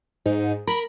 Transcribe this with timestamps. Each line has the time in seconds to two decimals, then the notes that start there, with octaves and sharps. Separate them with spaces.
0.26 G#2 D#4
0.67 A#4 B5